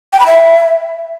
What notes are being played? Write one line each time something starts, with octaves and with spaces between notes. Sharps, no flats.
G5
B5
E5